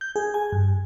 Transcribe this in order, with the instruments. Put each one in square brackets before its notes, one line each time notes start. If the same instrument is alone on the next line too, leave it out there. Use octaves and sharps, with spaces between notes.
[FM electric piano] G6
G#4
G#5
G2